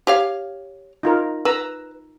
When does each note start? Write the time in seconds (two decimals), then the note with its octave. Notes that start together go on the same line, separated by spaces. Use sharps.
0.07 G4 C#5 F5
1.03 D#4 F4 A#4
1.45 B4 A#5 E6